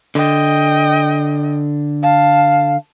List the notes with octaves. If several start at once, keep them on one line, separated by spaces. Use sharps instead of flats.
D3 D#5 G5
F5 A5